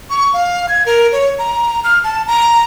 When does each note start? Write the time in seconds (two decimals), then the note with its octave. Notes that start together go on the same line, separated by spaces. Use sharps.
0.10 C#6
0.34 F5
0.69 G#6
0.86 A#4
1.12 C#5
1.39 A#5
1.84 F6
2.04 A5
2.27 A#5